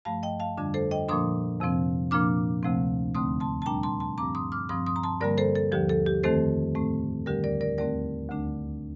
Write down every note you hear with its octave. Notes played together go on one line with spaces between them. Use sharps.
G2 F3 A3 F5 A5
D#5 G5
F5 A5
F2 D3 G3 D4
A4 C5
D#5 G5
A#2 F3 A#3 D4 C6 D#6
F2 C3 F3 C4
A#2 F3 A#3 D4 D6 F6
D2 C3 F3 A3 C4
D#2 D3 A3 C4 C6 D#6
A5 C6
A5
A#2 G3 D4 G5 A#5
A5 C6
A5 C6
G2 F3 C4 A#5 D6
C6 D#6
D6 F6
G2 F3 C4 C6 D#6
C6 D#6
A#5
A5 C6
G2 D3 G3 A#3 A#4 D5
A4 C5
A4
D#2 D3 F3 G4
A4
G4
F2 D#3 A3 C4 A4 C5
A2 A3 C4
D2 D3 G3 G4 A#4
A#4 D5
A#4 D5
D#2 D3 A3 C4 A#4 D5
D2 D3 A3 D4